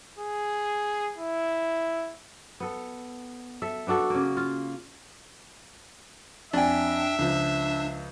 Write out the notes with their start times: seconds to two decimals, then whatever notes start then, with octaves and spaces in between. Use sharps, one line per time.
0.19 G#4
1.18 E4
2.60 B3 A4
3.62 A4 E5
3.87 B3 D4 F#4 A4
4.10 C#3 A#3
4.37 F4
6.53 F2 D4 D5 E5 G5 G#5
7.19 C#2 F3 D4